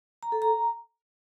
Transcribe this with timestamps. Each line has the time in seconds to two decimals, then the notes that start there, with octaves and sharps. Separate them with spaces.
0.23 A#5
0.32 A4
0.42 A#5